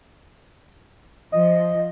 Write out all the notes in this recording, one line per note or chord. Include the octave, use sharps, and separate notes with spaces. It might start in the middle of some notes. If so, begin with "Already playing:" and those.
F3 D#5